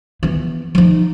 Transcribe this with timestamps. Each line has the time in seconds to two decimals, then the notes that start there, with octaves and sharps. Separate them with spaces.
0.23 E3 B3
0.75 F3 D#4